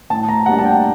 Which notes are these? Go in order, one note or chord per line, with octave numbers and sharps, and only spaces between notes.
A2 A5
A#5
G3 A#3 D4 F#5
A5
G5